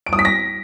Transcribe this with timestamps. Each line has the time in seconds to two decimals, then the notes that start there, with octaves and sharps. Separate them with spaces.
0.06 D7
0.13 D#6
0.19 B6
0.25 A#6